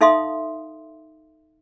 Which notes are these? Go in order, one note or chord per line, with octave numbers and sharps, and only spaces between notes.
D#4 A4 E5 F5 C6 D#6